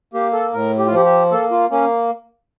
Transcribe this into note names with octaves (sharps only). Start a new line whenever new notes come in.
A#3 G4
A4
A2 A#4
G4
F4
F3 G4
G4
A#3 A4
F4
A#3 C#4